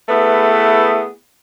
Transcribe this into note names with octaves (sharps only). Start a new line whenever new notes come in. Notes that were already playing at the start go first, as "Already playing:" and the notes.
A3 B3 E4 G#4 B4